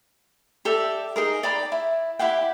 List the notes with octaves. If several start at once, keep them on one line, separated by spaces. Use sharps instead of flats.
G4 A4 D5 E5
D#4 G#4 A#4
D5 G5 A#5 B5
E4
E4 G4 F#5 G5